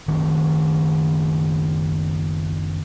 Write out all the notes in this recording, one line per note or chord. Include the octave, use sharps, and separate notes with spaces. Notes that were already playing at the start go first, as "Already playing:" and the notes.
F#1 D#3